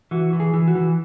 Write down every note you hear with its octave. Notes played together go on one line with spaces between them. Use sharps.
E3 F#4
E3
G#4
E3
F#4
E3